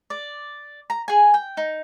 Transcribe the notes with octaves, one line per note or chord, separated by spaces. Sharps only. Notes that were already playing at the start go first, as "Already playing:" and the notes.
D5
A#5
G#4 G#5
G5
D#4